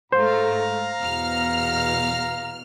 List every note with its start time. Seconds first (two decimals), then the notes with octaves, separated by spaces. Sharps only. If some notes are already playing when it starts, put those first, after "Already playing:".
0.12 G#2 A3 C5 F5 A#5
1.02 E2 B2 F6